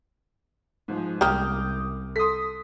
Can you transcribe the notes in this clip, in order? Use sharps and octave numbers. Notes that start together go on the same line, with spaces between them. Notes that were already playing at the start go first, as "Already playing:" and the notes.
G#2 F3 G#3
C2 C#3 A#3 G4 D6 D#6 F6 G6
A4 C6 D#6 B6